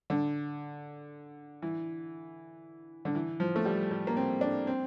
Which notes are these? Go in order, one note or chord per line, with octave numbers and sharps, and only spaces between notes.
D3
E3
D3
E3
F3
A3
G3
G3
A#3
C4
D4
C4